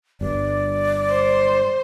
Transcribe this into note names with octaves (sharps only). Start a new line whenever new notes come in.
G1 G2 D5
C5